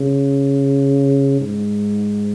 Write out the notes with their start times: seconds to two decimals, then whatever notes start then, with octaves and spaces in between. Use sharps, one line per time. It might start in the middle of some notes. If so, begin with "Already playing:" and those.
Already playing: C#3
1.40 G#2